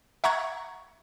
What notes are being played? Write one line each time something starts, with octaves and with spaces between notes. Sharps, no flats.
E5 F#5 A#5 C#6 F#6 G#6